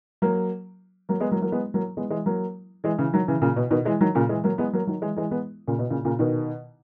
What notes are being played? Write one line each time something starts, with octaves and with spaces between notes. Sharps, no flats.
F#3 A#3
F#3 A#3
G#3 B3
F#3 A#3
F#3 A#3
G#3 B3
F#3 A#3
G#3 B3
E3 G#3
F#3 A#3
E3 G#3
C#3 E3
D#3 F#3
C#3 E3
A#2 C#3
B2
B2 D#3
E3 G#3
D#3 F#3
A#2 C#3
E3 G#3
F#3 A#3
G#3 B3
F#3 A#3
D#3 F#3
E3 G#3
E3 G#3
G#3 B3
A#2 C#3
B2
A#2 C#3
A#2 C#3
B2 D#3